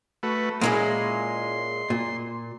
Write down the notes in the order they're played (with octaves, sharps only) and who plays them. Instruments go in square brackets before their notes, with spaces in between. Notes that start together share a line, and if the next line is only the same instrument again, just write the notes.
[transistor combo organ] A3 F#4 B4
[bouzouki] A#2 G#3 C#4 [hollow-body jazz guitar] A#3 E4 G#4 [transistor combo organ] C6
[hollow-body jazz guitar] A#2